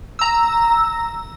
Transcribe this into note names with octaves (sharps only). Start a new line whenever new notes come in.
A#5 E6